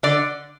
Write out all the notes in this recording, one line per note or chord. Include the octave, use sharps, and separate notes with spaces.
D3 D5